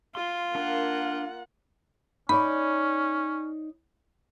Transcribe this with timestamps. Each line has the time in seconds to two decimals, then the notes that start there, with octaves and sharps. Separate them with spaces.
0.15 F4 C6
0.55 A#3 D4 A#4 F#5 C6
2.29 C#4 D#4 C#5 D5 B5